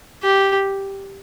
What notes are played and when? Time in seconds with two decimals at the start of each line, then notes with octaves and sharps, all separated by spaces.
0.23 G4